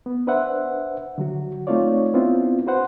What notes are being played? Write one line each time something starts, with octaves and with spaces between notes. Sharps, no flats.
B3
D4 B4 C5 E5 F#5
D3 F#3 F#4
A3 C4 D#4 F4 C#5 D5
B3 C4 D4 E4 F4
F#4 B4 C5 F#5